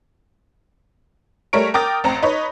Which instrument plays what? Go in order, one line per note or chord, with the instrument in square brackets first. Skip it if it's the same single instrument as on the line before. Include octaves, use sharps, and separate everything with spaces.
[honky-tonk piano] G3 A3 A#4 C#5 D7
A#4 G5 D6 D#6 A6
A1 C4 A#5
D#4 B4 C#5